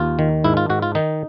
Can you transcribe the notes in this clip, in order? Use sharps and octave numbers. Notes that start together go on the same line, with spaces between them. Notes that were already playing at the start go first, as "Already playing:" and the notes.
Already playing: D#2 F4
D#3
G#2 E4
F4
G#2 F#4
F4
D#3 D#4